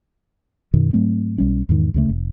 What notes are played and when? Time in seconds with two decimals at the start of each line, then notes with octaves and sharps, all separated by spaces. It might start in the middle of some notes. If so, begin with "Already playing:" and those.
0.74 F#2 B2 D#3
0.93 G#2 F#3 A3 C4
1.38 B1 G3 C#4
1.69 E2 G#2 D#3
1.94 D2 C#3 A3
2.09 F1